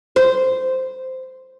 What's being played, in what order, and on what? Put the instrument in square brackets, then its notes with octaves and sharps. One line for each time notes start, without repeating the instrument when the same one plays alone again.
[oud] C5